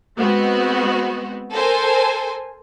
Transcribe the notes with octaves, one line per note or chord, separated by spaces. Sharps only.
G#3 B3 C4 F#4
A4 A#4 C5 G#5